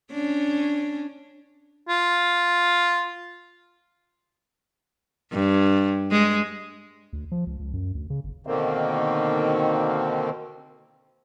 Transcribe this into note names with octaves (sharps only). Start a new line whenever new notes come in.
C#4 D4
F4
G2
G#3
D2
F3
C#2
C#2
F#2
D2
C#3
G1
B2 D3 D#3 A#3 C4